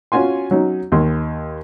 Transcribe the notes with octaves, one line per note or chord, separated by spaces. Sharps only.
C#4 F4 F#4 G#5 C6
F#3 C#4 D#4
D#2 C6